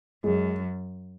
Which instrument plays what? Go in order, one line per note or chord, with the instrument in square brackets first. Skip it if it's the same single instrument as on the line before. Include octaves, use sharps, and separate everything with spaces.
[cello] F#2 [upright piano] G#3